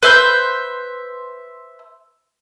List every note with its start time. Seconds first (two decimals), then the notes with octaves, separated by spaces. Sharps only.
0.03 B4 C5 E5 G6